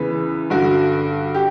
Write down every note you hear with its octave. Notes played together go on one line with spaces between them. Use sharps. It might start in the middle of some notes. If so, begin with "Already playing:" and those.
Already playing: E2 C#3 E3 B4
G2 D3 F#4
G4